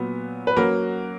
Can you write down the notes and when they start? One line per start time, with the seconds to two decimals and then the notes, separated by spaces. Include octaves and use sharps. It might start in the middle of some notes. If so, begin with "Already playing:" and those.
Already playing: A#2 F#3 B3
0.47 B4
0.57 F#3 A#3 C#4 F#4 A#4